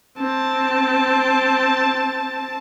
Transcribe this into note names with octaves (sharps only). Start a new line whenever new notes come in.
C4 A5